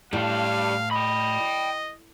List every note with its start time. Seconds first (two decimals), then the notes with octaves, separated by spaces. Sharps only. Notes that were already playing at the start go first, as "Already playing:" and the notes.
0.13 A2 G3 F5 A5
0.91 D#5 G5 B5